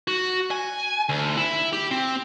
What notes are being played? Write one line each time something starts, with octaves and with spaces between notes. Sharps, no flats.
F#4
G#5
D2
E4
G4
C4